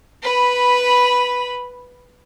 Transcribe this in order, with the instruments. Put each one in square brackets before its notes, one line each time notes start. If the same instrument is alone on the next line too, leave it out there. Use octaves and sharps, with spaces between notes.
[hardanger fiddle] B4 B5